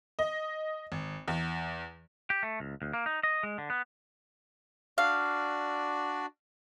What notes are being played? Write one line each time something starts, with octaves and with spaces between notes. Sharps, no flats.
D#5
G#1
E2
G4
A3
C#2
D2
A#3
D#4
D#5
G#3
D3
B3
D4 F#4 D5 F5